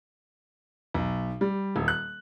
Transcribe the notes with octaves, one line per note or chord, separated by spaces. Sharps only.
B1
G3
D#1
F#6